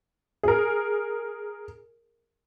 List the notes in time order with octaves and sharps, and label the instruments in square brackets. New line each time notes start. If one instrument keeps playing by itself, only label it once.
[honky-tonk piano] G#4 A#4